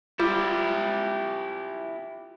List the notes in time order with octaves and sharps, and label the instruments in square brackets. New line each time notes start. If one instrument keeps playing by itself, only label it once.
[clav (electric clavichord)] G3 [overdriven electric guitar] E4 G4 [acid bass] F4